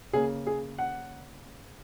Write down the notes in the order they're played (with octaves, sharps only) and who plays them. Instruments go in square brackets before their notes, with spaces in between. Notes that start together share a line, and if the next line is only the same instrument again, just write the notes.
[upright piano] C#3 A#3 G#4
G#4
F#5